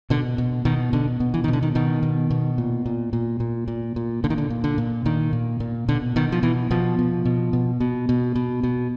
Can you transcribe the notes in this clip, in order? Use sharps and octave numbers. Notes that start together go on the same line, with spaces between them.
B2 D3
B2
B2 D#3
B2 D3
B2
E3
D#3
B2
D3
D#3
B2 D#3
B2
B2
A#2
A#2
A#2
A#2
A#2
A#2
A#2 D3
D#3
D3
A#2
D3
A#2
A#2 D#3
A#2
A#2
B2 D3
B2 D#3
F3
B2 E3
B2 F3
B2
B2
B2
B2
B2
B2
B2